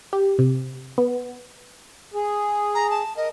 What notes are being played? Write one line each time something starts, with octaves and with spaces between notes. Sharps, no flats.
G4
C3
B3
G#4
A#5
A5
A#4 D#5